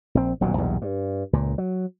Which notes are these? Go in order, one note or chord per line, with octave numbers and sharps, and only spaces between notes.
A#1 C4
D#1 B1 A#2 F#3
B1 E2 G2 A#2
G2
C#2 A#2
F#3